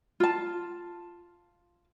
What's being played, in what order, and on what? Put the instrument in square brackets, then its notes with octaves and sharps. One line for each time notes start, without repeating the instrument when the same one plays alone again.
[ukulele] F4 A5